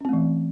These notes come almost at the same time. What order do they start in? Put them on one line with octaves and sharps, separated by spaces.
C#4 C4 A3 E3